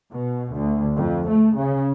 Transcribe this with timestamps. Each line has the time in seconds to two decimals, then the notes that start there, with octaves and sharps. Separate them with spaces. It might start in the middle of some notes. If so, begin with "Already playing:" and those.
0.12 B2
0.53 D2
0.97 F2
1.28 A3
1.58 C#3